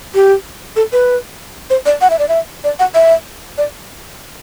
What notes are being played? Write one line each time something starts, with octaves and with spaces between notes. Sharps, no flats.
G4
A4
B4
C5
D5
F#5
E5
D5
E5
D5
F#5
E5
D5